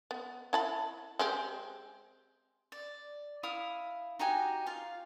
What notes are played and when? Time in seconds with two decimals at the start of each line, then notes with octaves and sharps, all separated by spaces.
0.11 B3
0.53 E4 A5 B5
1.19 G#3 C4 G4
2.72 D5
3.43 E4 F5 D#6
4.19 D#4 F#4 G4 G#5
4.66 F4 F5